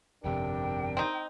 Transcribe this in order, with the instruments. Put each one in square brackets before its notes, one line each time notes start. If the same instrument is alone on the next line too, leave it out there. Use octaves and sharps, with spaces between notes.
[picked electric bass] G1 F2 C3 [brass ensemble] D4 G4 A#4 [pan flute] G5
[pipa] C4 D#4